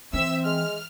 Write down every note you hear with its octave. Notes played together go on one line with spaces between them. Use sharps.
E3 C4 E5 E6
G#3 F6